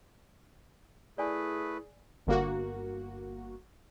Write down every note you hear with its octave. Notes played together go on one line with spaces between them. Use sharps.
A3 E4 G#4 B4 D5 G#5
G1 A#3 F#4